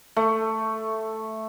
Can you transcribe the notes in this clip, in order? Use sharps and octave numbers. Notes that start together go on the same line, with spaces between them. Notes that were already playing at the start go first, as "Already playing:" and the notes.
A3